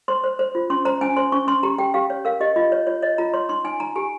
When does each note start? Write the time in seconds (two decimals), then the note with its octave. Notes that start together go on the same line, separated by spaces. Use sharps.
0.08 C5 C6
0.24 C5
0.39 C5
0.55 F4
0.70 C#4 C6
0.85 C5 A#5
1.01 C#4 G#5
1.17 C5 C6
1.32 C#4 C#6
1.47 C#4 C6
1.63 G4 A#5
1.78 G4 G5
1.94 G4 F5
2.10 C#5
2.25 A#4 F5
2.40 G4 D#5
2.56 F4 D#5
2.72 C#5
2.87 F4 C#5
3.02 C#5 D#5
3.18 F4 A#5
3.34 C#5 C6
3.49 D#4 C6
3.65 D#4 G#5
3.80 D#4 A#5
3.96 G4 G#5